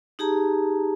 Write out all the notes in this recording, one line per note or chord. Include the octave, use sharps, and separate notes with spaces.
D#4 G4 G#4 A5 A#5